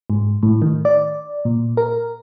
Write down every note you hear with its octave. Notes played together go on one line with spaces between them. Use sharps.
G#2
A2
D#3
D5
A#2
A#4